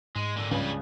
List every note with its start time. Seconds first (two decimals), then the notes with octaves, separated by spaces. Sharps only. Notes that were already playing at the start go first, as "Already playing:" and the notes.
0.16 G#2 G#3
0.36 A#2 D3
0.51 C#2 G2 C#3 G3 G#4